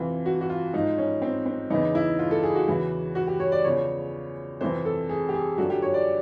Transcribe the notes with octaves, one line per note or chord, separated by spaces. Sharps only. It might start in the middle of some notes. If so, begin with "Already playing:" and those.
Already playing: F2 C3 E3 F4
F#4
F#4
F4
G#2 F3 D#4
C#4
C4
C4
E2 C#3 E3 D#4
E4
F4
A4
G#4
F#4
E2 C#3 E3
F#4
G4
C#5
D5
E2 C#3 F3 C#5
F2 C3 E3 C5
A4
G#4
G4
G#4
F#2 D3 F3 F#4
G4
C#5
D5